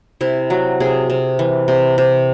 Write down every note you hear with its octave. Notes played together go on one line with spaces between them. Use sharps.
C3 E4
F#3 F#4
C3 G#4
C3
E3
C3
C3